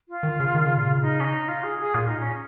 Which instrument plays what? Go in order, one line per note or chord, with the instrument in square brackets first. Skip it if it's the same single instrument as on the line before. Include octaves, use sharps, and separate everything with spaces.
[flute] F4
[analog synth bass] D#3
C#3
D#3
C#3
A#2
C#3
[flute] D#4
C#4
D#4
F4
G#4
G#4
[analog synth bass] A#2 [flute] F4
[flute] D#4
C#4